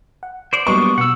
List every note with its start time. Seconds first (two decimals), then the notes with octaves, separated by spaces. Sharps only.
0.23 F#5
0.53 C5 D5
0.67 F#3 G3 A#3 B3 D4 B4 C#6
0.98 B2 F#5 E6